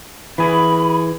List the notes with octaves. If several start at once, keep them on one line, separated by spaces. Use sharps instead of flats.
E3 G#4 B5